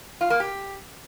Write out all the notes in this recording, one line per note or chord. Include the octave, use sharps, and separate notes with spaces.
F4
A#3
G4